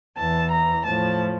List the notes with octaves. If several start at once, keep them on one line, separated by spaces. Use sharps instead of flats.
E2 E3 A5
A#5
A2 F3 A5